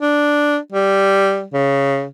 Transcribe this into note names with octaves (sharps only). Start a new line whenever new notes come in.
D4
G3
C#3